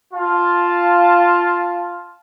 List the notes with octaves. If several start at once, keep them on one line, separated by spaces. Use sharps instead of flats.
F4 F5 A5